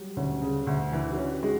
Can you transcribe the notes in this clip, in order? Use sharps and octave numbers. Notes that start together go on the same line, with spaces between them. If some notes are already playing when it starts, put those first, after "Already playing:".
Already playing: F#3 G3
D2 C#4
C#3
D2
E3 D4
F#4
C#4
G4
G#3 F#4